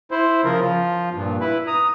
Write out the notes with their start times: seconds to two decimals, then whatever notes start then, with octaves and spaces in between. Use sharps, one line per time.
0.11 E4 C5
0.45 C#3 F3 F4 A#4
0.61 F3 F4
1.14 G2 A#2
1.41 E4 B4
1.67 A#5 D#6